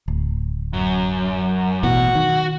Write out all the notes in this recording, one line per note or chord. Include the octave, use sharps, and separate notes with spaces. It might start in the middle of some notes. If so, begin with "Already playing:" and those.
D1
F#2
A1 B2 E3 F#4
D#3